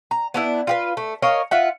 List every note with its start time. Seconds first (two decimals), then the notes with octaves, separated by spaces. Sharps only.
0.11 A#5
0.34 B3 D4 E4
0.67 F4 G4 B4
0.97 A3
1.22 A#4 C#5 D#5 F5
1.51 F4 E5 F#5